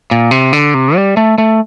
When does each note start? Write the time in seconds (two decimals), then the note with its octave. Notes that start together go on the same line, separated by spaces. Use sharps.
0.11 A#2
0.31 C3
0.53 D3
0.74 C3
0.96 G3
1.17 A3
1.38 A3